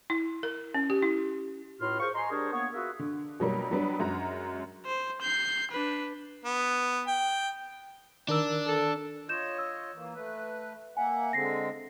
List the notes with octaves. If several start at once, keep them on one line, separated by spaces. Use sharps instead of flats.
E4
A#4
C#4
G4
E4
C#2 A2 F4 F#4 C6 F6
F4 G#4 A#4 C5 C#6
D#5 G#5 A#5 C6
G3 D4 G#4 A#4 C5 C#5
A#3 B3 C#5
F4 F#4 G#4 A#4 B4 E5
D3
B2 F#3 G3 A#3
F#3 G3 B3 D4
F#2 G#3 F#4 A#5
C5
G6 C7
D4 B4
B3
G5
D#3 D4 A#4 E6
A4
F4 C#5 D#5 G6 E7
E6
E3 A#3
A3 B4
A#3 E5 F#5 G#5
D3 G#3 C4 A#6 C7